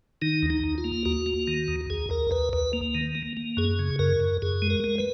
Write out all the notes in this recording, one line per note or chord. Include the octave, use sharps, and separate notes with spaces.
D#3 D#4
D#2
D#4
D#2
F4
A#3
D#2 F#4
A#3
D#3
D#2
D#2 G#4
D#2 A#4
D#2 B4
D#2 B4
A#3
D#3
A#3
A#3
F#2 G#4
C#3
F#2 A#4
F#2
F#2 G#4
G#3
A#4
G#3
B4